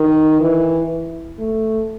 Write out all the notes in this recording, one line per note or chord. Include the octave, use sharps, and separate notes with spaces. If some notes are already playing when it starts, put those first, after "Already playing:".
Already playing: D#3
E3
A3